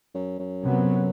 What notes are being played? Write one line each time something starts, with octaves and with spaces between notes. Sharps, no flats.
F#2
F#2
C3 F#3 B3